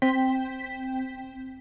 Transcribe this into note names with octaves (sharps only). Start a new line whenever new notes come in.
C4 G5 B6